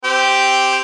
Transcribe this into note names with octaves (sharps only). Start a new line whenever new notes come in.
C4 G4 G5